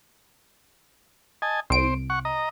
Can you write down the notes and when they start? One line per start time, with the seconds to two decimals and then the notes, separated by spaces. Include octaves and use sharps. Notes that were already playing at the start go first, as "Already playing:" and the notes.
1.42 D#5 G#5 A5
1.70 C2 C5 D7
2.10 F#5 C#6
2.25 D#5 A#5